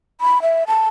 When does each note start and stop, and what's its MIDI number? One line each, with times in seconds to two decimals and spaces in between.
0.21 0.42 83
0.42 0.64 76
0.67 0.88 81